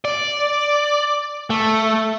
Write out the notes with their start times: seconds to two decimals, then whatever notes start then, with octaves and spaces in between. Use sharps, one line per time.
0.05 D5
1.50 A3